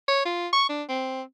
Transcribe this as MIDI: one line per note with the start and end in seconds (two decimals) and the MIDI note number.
0.08 0.23 73
0.25 0.48 65
0.53 0.65 85
0.69 0.83 62
0.89 1.22 60